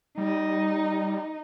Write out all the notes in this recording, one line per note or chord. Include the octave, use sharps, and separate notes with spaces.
G3 D#4